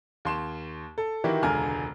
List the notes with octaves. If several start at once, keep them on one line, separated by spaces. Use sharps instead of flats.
D#2 C6 E7
A4
D#3 E3 E4 F#4 G4 A#4
E1 C#2 D3 G#5 A#5 F6